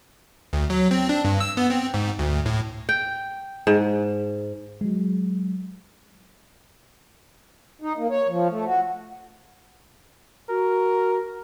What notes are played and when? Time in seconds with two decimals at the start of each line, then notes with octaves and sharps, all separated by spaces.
0.53 D2
0.70 F#3
0.91 C4
1.09 D4
1.25 G2
1.40 E6
1.57 B3
1.70 C4
1.94 G#2
2.19 D2
2.46 A2
2.89 G5
3.67 G#2
4.81 F#3 G#3
7.82 D#4
7.97 A#3
8.10 C#5
8.28 F3
8.50 A3
8.65 F#4
10.49 F#4 A#4